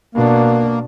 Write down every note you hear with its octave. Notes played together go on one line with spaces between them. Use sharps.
B2 A#3 D4